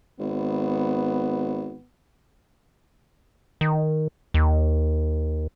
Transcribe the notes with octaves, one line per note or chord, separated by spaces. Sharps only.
G#1 B3
D#3
D#2